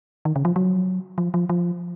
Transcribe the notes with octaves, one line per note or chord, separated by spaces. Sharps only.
D#3
C#3
F3
F#3
F3
F3
F3